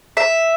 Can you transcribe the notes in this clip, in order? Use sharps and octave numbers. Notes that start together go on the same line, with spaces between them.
E5